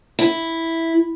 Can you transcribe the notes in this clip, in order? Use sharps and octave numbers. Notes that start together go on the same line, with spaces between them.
E4